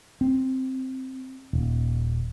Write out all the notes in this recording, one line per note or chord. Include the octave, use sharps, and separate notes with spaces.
C4
D#1